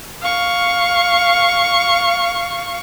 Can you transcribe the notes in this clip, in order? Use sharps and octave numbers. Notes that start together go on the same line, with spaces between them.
F5 C#6